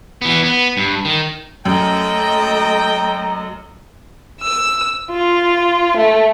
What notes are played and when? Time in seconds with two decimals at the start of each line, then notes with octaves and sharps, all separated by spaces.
0.22 E3 B3
0.44 B3
0.77 G2
1.05 D#3
1.65 F#2 A3 D#5 G5 A#5
4.42 E6
5.11 F4
5.97 A3